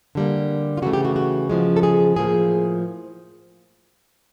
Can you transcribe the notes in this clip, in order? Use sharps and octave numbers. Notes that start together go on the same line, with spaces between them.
D3 G3 A#3
F4
C#3 E3 A3 F#4
G4
F#4
F#4
C#3 F3 G#3
A4
G#4
A2 F3 A#3 G#4